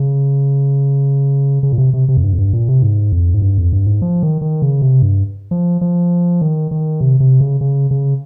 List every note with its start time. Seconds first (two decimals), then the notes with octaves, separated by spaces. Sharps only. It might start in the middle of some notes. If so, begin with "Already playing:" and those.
Already playing: C#3
1.63 C#3
1.72 A#2
1.78 C3
1.94 C3
2.09 C3
2.17 F2
2.24 G2
2.33 F2
2.38 G2
2.53 A#2
2.69 C3
2.82 G#2
3.12 F2
3.34 G#2
3.42 G2
3.58 F2
3.73 G2
3.87 G#2
4.02 F3
4.23 D#3
4.41 D#3
4.62 C#3
4.82 C3
5.02 G2
5.51 F3
5.81 F3
6.42 D#3
6.71 D#3
7.01 C3
7.20 C3
7.41 C#3
7.61 C#3
7.91 C#3